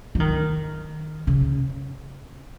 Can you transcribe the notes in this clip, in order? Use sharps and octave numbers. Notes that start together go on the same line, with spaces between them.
F3
D#3
C#3